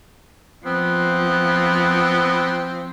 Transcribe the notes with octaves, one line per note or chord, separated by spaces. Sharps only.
F3 B3 C4